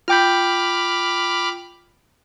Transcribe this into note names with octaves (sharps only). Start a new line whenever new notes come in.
F4 G5 B5 D6 F6 G6